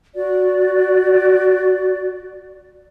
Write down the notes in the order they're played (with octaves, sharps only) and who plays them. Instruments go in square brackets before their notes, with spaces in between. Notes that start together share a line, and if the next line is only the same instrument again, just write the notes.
[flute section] F#4 D5